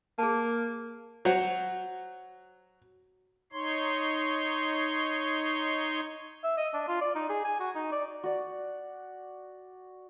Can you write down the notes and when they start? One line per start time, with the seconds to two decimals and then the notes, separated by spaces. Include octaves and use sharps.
0.18 A#3 G#4 A5
1.25 F#3 C5 F#5
3.53 D#4 C#5 C6
6.44 E5
6.57 D#5
6.74 D4
6.88 F4
7.01 D5
7.15 D#4
7.29 G#4
7.44 G#5
7.60 F#4
7.75 D#4
7.92 D5
8.24 F#4 D5